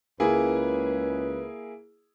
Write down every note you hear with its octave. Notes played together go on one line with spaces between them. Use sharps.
C#2 A#3 E4 G#4 B4